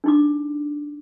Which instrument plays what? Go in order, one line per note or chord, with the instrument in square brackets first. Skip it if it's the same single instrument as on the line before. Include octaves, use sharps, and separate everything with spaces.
[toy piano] D4 D#4 D6